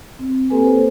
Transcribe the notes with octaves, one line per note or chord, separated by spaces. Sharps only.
C4
A#3 C4 G4 A4 B4 G#5
A4 C5